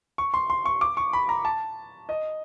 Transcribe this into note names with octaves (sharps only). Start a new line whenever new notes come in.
C#6
C6
C6
C#6
D6
C#6
B5
A#5
A5
D#5